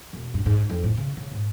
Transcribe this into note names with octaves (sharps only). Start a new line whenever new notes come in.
E1
G2
G#2
F2
A2
C#3
C#3
G#2